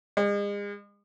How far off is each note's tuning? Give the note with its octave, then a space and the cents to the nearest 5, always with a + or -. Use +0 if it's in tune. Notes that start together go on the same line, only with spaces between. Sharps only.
G#3 -40